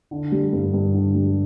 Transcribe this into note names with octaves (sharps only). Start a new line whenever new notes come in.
D3
G3
G2
G2
D3
G3